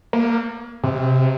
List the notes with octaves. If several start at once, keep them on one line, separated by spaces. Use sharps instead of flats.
A#3
C3